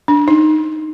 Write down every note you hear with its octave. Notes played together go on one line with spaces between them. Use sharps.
D4
D#4